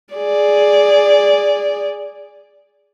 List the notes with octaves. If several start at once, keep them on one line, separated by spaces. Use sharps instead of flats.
G#4 D5